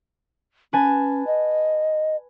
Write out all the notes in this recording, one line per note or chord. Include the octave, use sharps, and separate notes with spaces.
C#4 B4 G#5 A5
D#5